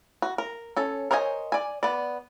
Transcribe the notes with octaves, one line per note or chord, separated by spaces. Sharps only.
F#4
A#4
C#4 A4
A#4 C5 C#5 D#5 G#5
D5 G#5
B3 D5